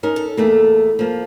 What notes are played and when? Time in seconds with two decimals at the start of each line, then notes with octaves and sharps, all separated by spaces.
0.03 C#4 D#4 A#4
0.16 A4
0.37 E2 A3 A#3
0.99 F3 A#3